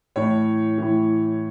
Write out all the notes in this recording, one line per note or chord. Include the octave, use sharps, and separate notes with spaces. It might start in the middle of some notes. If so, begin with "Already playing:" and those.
A2 E3 C#5
A2 E3